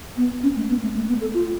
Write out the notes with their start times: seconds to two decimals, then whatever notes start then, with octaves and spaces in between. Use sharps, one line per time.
0.17 B3
0.43 C#4
0.56 A3
0.69 B3
0.83 A3
0.95 A3
1.09 B3
1.21 A4
1.34 F4